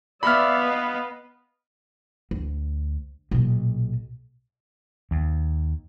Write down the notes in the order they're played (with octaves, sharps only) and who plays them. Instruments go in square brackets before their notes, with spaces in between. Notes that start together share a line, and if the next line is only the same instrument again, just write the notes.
[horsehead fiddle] B3 F5 [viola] D5 E5 [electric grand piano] B5 F6
[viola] B4 D#5
[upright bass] D2
B1 A#2
[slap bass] D#2